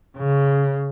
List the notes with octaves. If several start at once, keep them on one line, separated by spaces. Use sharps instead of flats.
C#3